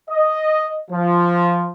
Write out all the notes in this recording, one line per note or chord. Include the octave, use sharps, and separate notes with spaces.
D#5
F3